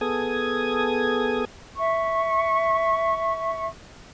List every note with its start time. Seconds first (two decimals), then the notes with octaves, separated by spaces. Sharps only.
0.01 B3 G#4 A4 D#6 G#6
1.76 E5 C#6